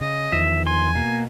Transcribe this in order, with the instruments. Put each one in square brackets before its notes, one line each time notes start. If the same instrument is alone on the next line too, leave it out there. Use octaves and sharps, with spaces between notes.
[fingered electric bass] C#3 [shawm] D#5
[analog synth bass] E2 [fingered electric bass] D#3 F3 [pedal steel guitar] E5
[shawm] G#5 [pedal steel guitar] C6
[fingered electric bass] B2 [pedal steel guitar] A#3